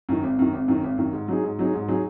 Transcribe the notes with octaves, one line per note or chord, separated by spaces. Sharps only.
F#2 D#3
G#1
F#2 D#3
G#1
F#2 D#3
G#1
F#2 D#3
G#2
F#3 D#4 G#4
G#2
F#3 D#4 G#4
G#2
F#3 D#4 G#4